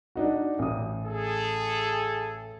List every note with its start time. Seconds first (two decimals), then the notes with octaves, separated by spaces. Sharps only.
0.16 D4 D#4 F#4
0.59 A1 D#6
1.05 G#4 A4